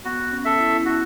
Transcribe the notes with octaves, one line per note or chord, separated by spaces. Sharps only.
B3 F#4
C#4
A4 E5
E4
F#4